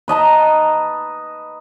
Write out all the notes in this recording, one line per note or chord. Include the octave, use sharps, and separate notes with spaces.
B4 D#5 A5 A#5